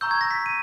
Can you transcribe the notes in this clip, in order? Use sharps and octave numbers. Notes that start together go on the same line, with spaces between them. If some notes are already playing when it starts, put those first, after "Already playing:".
A#5 C#6 E6 G6
G#6
A#6
B6
D#7